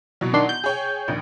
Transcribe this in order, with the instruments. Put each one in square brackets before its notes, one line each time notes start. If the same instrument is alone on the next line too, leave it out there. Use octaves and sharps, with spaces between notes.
[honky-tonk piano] B2 E3 F#3
[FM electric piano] D#3 D4 C6
G6
[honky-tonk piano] G#4 C#5 G5
A#1 D#2